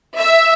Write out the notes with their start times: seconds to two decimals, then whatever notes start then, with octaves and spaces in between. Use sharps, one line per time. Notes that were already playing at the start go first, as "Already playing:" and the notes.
0.15 E5